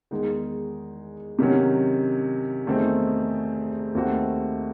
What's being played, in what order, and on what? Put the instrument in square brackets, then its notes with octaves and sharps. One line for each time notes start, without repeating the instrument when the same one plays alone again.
[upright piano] E2 D#3 G#3 D#4
C3 D#3 F#3 C#4
E2 D#3 A3 C4 D#4
D#2 D#3 A3 C4 F#4